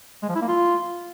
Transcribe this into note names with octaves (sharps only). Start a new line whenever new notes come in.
G#3
F3
E4
A#3
F4